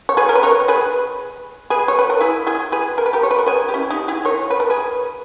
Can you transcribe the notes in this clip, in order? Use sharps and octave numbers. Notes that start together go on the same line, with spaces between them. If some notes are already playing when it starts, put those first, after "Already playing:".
C#5
G#4 B4
A#4
B4
A#4 C#5
G#4 B4
G#4 B4
C#5
B4
A#4
E4 G#4
E4 G#4
G#4 B4
A#4
B4
G4 A#4
C#5
B4
A#4
G#4 B4
G4
C#4 E4
D#4 G4
E4 G#4
A#4 C#5
B4
A#4
G#4 B4